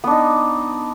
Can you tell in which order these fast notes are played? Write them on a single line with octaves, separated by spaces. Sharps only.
B3 D4 D#4